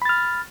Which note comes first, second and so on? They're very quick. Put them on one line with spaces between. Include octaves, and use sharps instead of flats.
B5 A6 F6